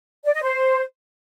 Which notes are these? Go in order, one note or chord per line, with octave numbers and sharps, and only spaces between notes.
D5
D#5
C5